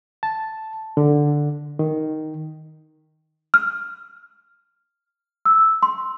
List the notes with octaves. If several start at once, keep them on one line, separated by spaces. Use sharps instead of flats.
A5
D3
D#3
F6
E6
C6